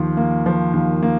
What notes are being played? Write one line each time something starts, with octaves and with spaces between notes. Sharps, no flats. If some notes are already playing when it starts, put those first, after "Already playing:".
Already playing: D#2 F3
A#3
F3
D#2
A#3